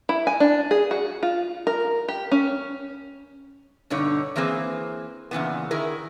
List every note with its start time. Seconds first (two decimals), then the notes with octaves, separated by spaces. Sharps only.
0.09 E4
0.27 G#5
0.40 D4
0.71 G#4
0.91 F#4
1.23 F4
1.67 A#4
2.08 G4
2.31 C#4
3.90 G2 B2 D3 D#4 C#5
4.36 E3 A#3 C4 G#4 B4
5.31 A#2 C#3 E3 B3
5.71 D#3 E4 G#4 A#4